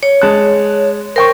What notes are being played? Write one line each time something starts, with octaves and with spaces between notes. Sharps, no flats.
C#5
G#3 A5 F#6
A#4 C5 G5 C#6